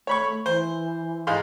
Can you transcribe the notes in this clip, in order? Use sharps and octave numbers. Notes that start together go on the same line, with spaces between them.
A3 C#5 B5 C#6
E3 C5
G#2 F5 C6